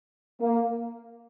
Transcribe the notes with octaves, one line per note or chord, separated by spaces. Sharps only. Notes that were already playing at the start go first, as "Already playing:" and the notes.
A#3